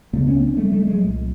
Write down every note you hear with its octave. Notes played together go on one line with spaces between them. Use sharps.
C#2 C#3 A3 B3
B3 C#4
C4 D4
G3 A3
G3 A3
F#3 G#3
C2 A#2